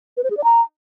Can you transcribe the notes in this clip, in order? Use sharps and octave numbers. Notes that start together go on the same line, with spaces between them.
B4
C5
G#4
D5
A#5